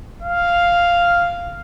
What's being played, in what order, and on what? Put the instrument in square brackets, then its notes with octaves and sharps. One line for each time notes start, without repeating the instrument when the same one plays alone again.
[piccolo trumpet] F5